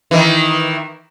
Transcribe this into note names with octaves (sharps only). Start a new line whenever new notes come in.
D#3 E3